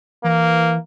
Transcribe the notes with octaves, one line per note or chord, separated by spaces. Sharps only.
E3 A#3